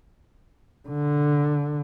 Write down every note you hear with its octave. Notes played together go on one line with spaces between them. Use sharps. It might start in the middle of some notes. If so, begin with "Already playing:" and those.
D3